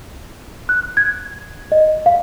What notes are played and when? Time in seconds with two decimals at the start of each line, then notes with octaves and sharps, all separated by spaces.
0.69 F#6
0.97 G#6
1.72 D#5
2.06 F5